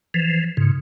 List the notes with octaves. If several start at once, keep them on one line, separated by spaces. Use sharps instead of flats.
E3 F3
G#2 C#3